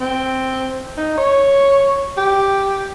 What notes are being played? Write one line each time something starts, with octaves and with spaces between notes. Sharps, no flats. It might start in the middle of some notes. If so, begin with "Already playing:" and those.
C4
D#4
C#5
G4